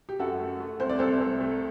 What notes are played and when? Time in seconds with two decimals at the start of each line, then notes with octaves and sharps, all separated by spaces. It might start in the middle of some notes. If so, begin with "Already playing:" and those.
0.09 G4
0.19 F#2 F#4 A4
0.39 A3
0.60 A3
0.80 C2 C5
0.89 D5
0.99 C2 A4 C5
1.21 C2
1.40 A3